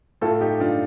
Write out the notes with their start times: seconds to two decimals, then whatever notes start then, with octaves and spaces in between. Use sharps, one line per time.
0.21 A2 F4 A4
0.41 D#4 G4
0.60 D4 F4